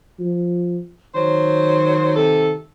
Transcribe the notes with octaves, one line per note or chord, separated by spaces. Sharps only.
F3
D#3 F#3 C5
C3 A4